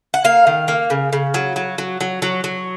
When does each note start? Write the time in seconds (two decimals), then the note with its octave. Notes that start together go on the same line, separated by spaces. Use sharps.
0.14 F#5
0.24 A#3 F5
0.47 D#3
0.68 A#3
0.90 C#3
1.13 C#3
1.34 F#3
1.56 F#3
1.78 F#3
2.01 F#3
2.22 F#3
2.44 F#3